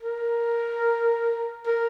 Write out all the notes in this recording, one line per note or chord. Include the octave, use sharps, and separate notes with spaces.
A#4
A#4